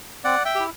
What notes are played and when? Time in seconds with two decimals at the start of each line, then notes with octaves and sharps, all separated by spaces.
0.24 C4 D5 F#5
0.45 E5 G5
0.55 E4 G4